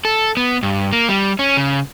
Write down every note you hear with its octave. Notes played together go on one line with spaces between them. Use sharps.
A4
B3
G2
A#3
G3
C#4
C#3